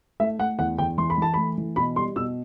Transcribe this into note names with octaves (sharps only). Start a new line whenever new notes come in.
A3 E5
A3 F#5
E2 F#5
E2 G5
E3 C6
B5
E3 A5
A3 B5
E3
B2 B5
G3 C6
B2 E6